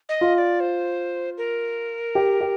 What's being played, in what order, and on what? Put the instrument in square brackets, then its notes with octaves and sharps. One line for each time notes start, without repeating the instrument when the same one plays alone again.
[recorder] D#5
[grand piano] F4
[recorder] D#5
D5
C5
A#4
[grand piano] G4
G4